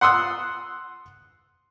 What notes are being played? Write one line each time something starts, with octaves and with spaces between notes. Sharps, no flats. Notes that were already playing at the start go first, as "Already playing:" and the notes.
F#5 C6 D#6 E6 F#6